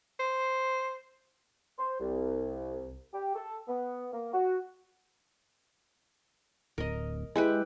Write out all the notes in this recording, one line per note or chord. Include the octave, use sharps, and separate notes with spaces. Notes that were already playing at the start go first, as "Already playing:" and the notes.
C5
C5
C2
G4
A4
B3
A#3
F#4
D1 A#4 D#5
G#3 E4 G4 B4